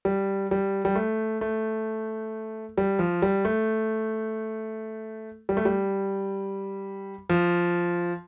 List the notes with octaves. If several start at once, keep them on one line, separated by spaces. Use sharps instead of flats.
G3
G3
G3
A3
A3
G3
F3
G3
A3
G3
A3
G3
F3